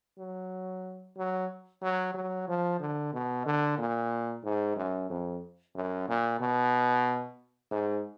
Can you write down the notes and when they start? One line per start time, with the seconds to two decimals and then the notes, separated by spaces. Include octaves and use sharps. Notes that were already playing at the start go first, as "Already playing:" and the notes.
0.18 F#3
1.17 F#3
1.82 F#3
2.14 F#3
2.48 F3
2.80 D3
3.13 B2
3.46 D3
3.78 A#2
4.43 G#2
4.76 F#2
5.10 F2
5.75 F#2
6.08 A#2
6.40 B2
7.71 G#2